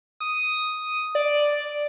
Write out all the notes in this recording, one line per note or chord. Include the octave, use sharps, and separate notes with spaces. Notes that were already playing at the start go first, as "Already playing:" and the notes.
D#6
D5